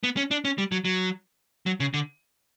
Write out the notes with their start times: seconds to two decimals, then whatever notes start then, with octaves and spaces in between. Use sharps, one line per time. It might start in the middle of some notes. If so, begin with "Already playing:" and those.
0.03 B3
0.17 C#4
0.31 D4
0.45 C#4
0.58 G3
0.72 F#3
0.85 F#3
1.66 F#3
1.80 C#3
1.94 D3